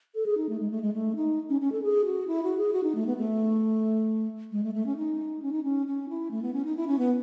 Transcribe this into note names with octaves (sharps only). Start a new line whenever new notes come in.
A4
G#4
D#4
A3
G#3
A3
G#3
A3
D#4
C#4
C#4
A4
G#4
F#4
E4
F#4
G#4
F#4
D#4
A3
B3
A3
G#3
A3
A3
C#4
D#4
C#4
D#4
C#4
C#4
E4
A3
B3
C#4
D#4
E4
C#4
B3